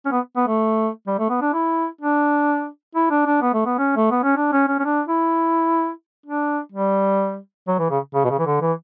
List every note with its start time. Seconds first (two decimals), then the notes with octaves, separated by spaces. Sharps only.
0.06 C#4
0.12 B3
0.36 B3
0.48 A3
1.07 G3
1.19 A3
1.30 B3
1.41 D4
1.53 E4
2.01 D4
2.95 E4
3.10 D4
3.26 D4
3.42 B3
3.54 A3
3.66 B3
3.78 C#4
3.97 A3
4.11 B3
4.23 C#4
4.37 D4
4.52 C#4
4.68 C#4
4.79 C#4
4.85 D4
5.08 E4
6.26 D4
6.72 G3
7.68 F#3
7.79 E3
7.90 C#3
8.14 C#3
8.24 B2
8.30 C#3
8.39 E3
8.46 D3
8.61 E3